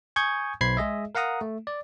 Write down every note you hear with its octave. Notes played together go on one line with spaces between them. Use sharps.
G#5 C#6 D#6 G6 G#6
B1 C5 B5 G#6 C7
G#3 G#4 D#5 E5
A#4 F5 F#5 A#5 D#6
A3
D5